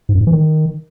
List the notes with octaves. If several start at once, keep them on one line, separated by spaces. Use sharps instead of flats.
G#2
F#2
G#2
E3
D#3